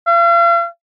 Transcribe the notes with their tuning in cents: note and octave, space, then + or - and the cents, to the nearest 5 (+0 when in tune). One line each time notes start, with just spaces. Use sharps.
F5 -40